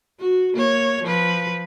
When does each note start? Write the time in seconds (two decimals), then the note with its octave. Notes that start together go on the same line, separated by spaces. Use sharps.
0.20 F#4
0.54 A#3 C#5
1.03 F3 B4